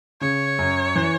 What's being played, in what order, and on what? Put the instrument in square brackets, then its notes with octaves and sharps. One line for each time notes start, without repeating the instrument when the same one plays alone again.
[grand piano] C#3 [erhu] C#5
[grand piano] F#2
E3